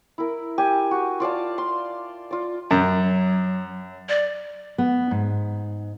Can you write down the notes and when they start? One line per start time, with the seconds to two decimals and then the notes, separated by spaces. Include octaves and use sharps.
0.18 E4 A#4
0.58 G4 G#5
0.91 F#4
1.20 F4 D5 F5 A5
1.58 C6
2.31 F4 D5
2.71 F#2 F#3
4.09 D5
4.78 B3
5.11 G#2